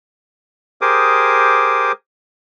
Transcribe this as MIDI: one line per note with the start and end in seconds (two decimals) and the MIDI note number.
0.81 1.92 67
0.81 1.92 68
0.81 1.92 70
0.81 1.92 72
0.81 1.92 86
0.81 1.92 87